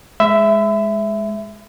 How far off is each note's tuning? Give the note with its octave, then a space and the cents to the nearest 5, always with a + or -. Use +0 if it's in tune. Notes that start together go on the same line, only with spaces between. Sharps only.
G#3 +0 E5 +0 B5 +40